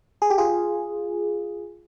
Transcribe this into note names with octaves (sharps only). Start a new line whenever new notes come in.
G#4
G4
F4 G#4